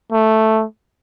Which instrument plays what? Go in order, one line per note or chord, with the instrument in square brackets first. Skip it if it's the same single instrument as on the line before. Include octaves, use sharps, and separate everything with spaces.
[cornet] A3